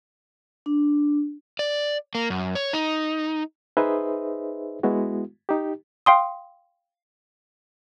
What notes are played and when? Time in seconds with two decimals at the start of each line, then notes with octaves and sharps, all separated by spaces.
0.66 D4
1.59 D5
2.15 A#3
2.30 F#2
2.55 C#5
2.73 D#4
3.77 D#4 G#4 B4 C5 D#5 E5
4.83 G#3 B3 E4 F#4
5.49 D#4 G4
6.06 F5 G5 C6 D#6